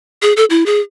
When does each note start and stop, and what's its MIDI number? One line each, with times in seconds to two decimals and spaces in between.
0.22 0.33 68
0.37 0.45 69
0.50 0.66 64
0.66 0.80 68